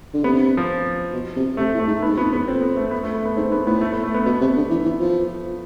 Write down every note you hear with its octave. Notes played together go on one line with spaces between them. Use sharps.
D3
C3 B3
F3
B2
C3
C3 A3
A2
A3
G#2
B3
G#2
F2 B3
E2 B3
F2 C4
B3
A3
B3
A3
A3
B3
G#2 C4
G#2 B3
A2 B3
A3
B3
A3
B3
B2 B3
C3
D3
E3
E3
F3